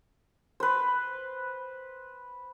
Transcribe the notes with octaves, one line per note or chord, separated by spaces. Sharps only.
B4 C5